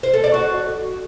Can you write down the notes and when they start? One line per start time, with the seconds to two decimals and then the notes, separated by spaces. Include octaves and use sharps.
0.03 C5
0.13 A4
0.24 D5
0.34 F#4